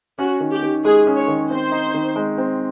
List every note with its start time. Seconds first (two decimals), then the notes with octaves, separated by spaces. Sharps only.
0.19 C#4 F#4
0.40 D#3
0.52 G4
0.62 D#3
0.84 G#3 G#4
1.07 C#4
1.17 C#5
1.28 D#3
1.50 C4 C5
1.72 D#4
1.94 D#3
2.16 G#3
2.38 C4